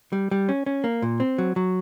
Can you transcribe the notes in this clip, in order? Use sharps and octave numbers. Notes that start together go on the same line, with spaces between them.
G3
G3
C#4
C#4
A#3
A#2
C4
F#3
F#3